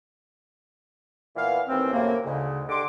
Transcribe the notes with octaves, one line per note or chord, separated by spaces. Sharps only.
A#2 E3 B3 F5
D#2 A2 E3 C4
F#2 A2 C3 A#3
D2 G#2 C#3
D3 G4 C6 D6